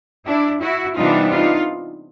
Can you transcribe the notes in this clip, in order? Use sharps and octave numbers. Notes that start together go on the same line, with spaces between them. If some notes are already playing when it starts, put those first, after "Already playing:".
D4 E4
E4 F#4
C3 E3 G3 B3 D4 D#4 F4
D#4 F4